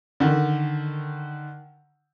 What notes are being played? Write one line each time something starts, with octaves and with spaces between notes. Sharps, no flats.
D3 D#3